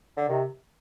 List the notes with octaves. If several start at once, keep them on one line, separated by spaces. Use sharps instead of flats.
D3
C3 D#3